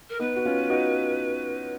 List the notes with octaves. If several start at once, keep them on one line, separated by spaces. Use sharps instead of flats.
A#4
B3 D#4 B4
F#4
C#4 F4
D#4 F#4